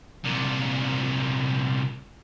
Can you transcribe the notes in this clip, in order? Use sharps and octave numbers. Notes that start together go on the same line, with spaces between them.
C2 A#2